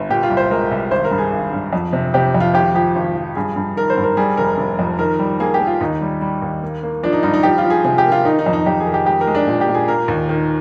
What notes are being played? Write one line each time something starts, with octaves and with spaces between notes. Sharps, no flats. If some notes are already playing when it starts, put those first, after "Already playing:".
Already playing: G1
A#2 G4
F4
C2
C5
G#3 A#4
C2
G#1 C5
A#4
G2
G#4
G#1
G2
F2
C3
C3 G4
F2
F4
G#1 G4
F3 G4
G#1
F3
G2 G#4
G2
D#3 A#4
C5
G2
A#4
G3 G#4
F1 A#4
F1
F2
D#3 A#4
G3
A#3 G#4
G4
A#3
F4
D#2 D#4
G3
G3
D#2
A#3
A#3
F3 D4
D#4
G2 D#4
D#4
F3 G4
F4
F3
G#4
C3 G#4
G4
A#3
F4
D#3 D#4
D#4
F2
D#4
F2 G4
G#4
D#3
G4
G#3 G4
A#4
G#3
D4
A#2
G4
A#2
G#4
A#3 A#4
D#2
D#3